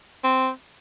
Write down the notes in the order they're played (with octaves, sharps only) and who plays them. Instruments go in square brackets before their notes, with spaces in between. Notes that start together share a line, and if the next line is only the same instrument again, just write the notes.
[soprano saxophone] C4